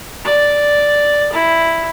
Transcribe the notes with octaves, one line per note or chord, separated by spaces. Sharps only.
D5
E4